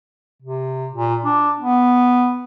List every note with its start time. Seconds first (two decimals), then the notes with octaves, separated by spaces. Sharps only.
0.42 C3
0.92 A#2
1.25 D4
1.60 B3